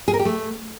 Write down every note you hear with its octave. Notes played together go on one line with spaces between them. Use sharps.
G#4
A#4
G4
A3